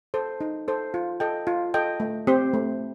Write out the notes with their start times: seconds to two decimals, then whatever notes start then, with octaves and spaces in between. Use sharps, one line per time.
0.14 A4 C5
0.41 D#4
0.68 A4 C5
0.94 F4
1.20 A4 D#5 G5
1.47 F4
1.74 A4 D#5 G5
2.00 A3
2.27 C4 G4 C5
2.54 A3